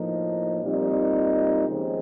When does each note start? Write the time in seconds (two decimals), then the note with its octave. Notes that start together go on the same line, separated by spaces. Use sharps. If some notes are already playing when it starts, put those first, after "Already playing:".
Already playing: A2 F3 A#3 D#4
0.63 A#2 G3 C4 D#4
1.68 D#2 C#3 F3 G#3 C4